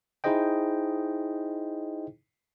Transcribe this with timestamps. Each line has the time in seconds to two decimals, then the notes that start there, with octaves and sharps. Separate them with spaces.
0.24 D#4 E4 G#4 C5 D#5 G5